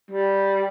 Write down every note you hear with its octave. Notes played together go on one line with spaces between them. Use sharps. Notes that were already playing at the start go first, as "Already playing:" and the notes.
G3